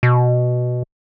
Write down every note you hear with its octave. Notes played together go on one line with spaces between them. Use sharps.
B2